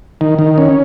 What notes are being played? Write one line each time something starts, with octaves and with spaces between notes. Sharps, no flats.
D#3
D#3
C#4